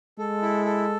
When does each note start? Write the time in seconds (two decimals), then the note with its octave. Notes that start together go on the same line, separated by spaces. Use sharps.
0.19 G#3 A4
0.42 E4
0.65 A4